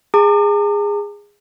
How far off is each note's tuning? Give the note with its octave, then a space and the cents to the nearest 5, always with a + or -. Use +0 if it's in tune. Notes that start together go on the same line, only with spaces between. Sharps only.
G#4 -15 A#5 -45 D6 +35